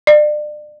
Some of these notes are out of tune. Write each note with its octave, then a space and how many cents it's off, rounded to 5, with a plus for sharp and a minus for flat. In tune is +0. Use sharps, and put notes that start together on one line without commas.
D5 +35